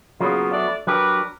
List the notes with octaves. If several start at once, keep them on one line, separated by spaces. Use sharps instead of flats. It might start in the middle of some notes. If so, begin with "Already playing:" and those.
C#3 F#3 A#3 B3 F4
A3 D4 D5
F#3 D4 G4 A#4 B4